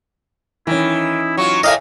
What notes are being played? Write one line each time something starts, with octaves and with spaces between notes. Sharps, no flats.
D#3 E3 C#4 E4
F#3 F4 C#6
A2 A3 A#4 D#5 F5 G#5